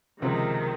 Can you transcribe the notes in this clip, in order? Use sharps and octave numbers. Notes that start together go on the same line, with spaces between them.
C#2 C3 D#3 F3 C4